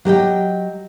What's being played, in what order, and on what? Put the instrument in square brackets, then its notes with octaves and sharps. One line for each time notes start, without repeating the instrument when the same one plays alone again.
[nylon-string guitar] F#3 G4 D#5 G5